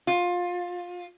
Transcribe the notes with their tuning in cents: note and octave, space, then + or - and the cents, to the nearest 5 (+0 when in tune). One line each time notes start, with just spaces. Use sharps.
F4 +20